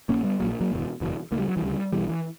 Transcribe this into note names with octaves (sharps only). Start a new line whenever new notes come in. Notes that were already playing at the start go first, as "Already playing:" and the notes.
A#1 A#2 A#3 C#4
G3 B3
A#1 A#2 F#3 A#3
F#3 A#3
F#1 E2 B2
F#1 E2 B2
D2 C#3 G3 A#3
F#3
E3 G3
D2 C#3
B1 B2 E3 G3
E3